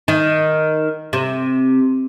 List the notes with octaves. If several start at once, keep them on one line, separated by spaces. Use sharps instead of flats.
D#3
C3